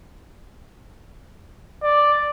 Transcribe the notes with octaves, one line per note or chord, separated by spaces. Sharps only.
D5